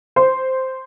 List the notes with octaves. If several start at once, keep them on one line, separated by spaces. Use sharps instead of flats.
C5